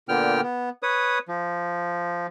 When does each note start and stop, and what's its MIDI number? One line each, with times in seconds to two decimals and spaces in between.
0.09 0.41 46
0.09 0.41 50
0.09 0.41 59
0.09 0.41 79
0.09 0.41 89
0.43 0.69 59
0.83 1.19 71
0.83 1.19 73
0.83 1.19 87
1.28 2.27 53